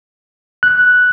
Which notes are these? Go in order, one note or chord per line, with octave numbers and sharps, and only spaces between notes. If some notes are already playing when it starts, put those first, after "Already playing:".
F#6